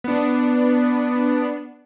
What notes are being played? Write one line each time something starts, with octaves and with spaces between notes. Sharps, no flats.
B3 D4